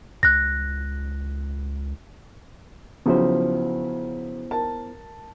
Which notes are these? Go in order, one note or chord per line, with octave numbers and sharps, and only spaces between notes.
C#2 F#6 A#6
C#3 F3 F#3 B3 E4 C5
A#4 A5